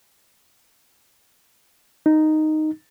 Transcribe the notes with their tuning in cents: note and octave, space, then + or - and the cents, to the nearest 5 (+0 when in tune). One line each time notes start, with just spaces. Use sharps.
D#4 -5